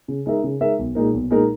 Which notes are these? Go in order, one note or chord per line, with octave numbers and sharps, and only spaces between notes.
C#3
G#3 D#4 A#4 E5
C#3
G#3 D#4 A#4 E5
B1
A#2 G#3 D#4 A#4
B1
A#2 G#3 D#4 A#4